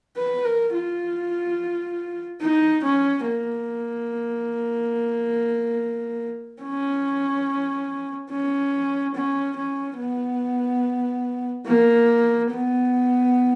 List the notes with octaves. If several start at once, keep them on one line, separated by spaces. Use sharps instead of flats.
B4
A#4
F4
D#4
C#4
A#3
C#4
C#4
C#4
C#4
B3
A#3
B3